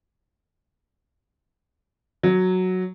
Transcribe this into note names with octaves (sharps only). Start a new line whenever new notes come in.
F#3